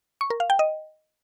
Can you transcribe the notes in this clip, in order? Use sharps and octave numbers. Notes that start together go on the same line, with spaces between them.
C#6
A#4
F5
G5
D#5